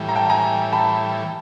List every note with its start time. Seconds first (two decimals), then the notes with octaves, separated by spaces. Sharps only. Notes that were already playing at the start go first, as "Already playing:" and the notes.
Already playing: A2 E3 G3
0.09 A#5
0.16 G5 A5
0.30 G#5 A#5
0.73 A5 B5